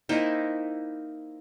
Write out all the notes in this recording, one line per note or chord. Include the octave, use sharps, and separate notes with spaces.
A#3 C4 D#4 E4